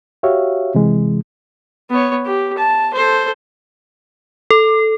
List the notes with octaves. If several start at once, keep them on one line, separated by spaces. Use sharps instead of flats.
F#4 G4 C#5 E5 F5
C3 E3 G#3
B3 C#5
G4
A5
A4 C5
A4